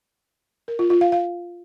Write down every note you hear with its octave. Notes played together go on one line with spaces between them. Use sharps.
A#4
F4
F4
F5
F5